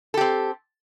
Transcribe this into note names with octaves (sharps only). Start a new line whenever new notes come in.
C4 G4 A4